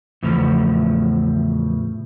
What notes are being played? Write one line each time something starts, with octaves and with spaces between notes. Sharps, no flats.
E2 A2 C#3 E3 F3